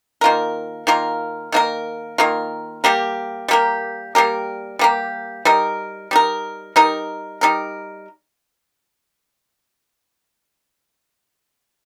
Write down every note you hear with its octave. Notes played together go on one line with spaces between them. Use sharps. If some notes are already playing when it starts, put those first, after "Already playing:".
D#3 A#3 F4 A#4
D#3 A#3 F4 A#4
D#3 A#3 F4 A#4
D#3 A#3 F4 A#4
G3 A#3 G4 A#4
G3 A#3 G4 A#4
G3 A#3 G4 A#4
G3 A#3 G4 A#4
G3 D#4 A#4
G3 D#4 A#4
G3 D#4 A#4
G3 D#4 A#4